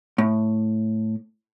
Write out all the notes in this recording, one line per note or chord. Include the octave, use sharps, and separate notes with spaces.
A2